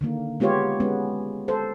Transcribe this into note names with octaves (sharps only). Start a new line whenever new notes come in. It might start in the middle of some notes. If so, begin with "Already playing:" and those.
D3 D#3 A#3
G#3 B3 F4 G4 C#5
G#3 B3 C#4
A4 C5